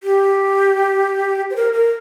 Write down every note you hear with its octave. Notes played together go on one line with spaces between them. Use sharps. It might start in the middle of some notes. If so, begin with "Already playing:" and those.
G4
C5
A#4
A#4